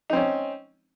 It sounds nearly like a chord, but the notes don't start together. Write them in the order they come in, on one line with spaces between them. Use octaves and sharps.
D#4 C4 C#4